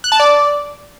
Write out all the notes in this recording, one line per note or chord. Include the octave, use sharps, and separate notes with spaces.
F#6
A5
D5